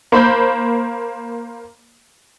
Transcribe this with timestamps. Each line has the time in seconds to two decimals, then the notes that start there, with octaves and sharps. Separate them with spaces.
0.12 A#3 C5 B5 G6